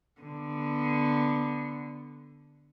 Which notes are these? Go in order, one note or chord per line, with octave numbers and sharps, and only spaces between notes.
D3 B3